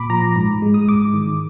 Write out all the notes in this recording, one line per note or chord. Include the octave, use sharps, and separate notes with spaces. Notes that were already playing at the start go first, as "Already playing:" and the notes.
Already playing: A#2 B5 D6
F3 A#5
G#2
G#3
D#6
G#2 D6
D#3